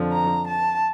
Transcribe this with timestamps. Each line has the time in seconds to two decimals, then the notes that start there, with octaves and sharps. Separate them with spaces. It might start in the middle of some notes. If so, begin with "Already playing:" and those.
Already playing: F2 D3 F3
0.13 A#5
0.48 A5